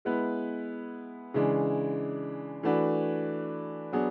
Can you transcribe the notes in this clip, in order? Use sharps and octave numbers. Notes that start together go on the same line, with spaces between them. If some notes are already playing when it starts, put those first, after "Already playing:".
G#3 B3 E4 B4
C#3 E3 G#3 D4
E3 A3 D4 F#4 B4
F#3 B3 D4 G#4